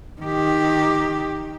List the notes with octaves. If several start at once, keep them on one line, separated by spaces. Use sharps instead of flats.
D#3 G4